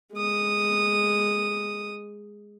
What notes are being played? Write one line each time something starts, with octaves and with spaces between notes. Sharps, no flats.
G#3 D#6